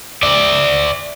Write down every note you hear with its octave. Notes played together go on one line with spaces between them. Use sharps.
D5 E5